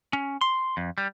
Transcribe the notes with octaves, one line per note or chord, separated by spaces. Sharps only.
C#4
C6
F2
G3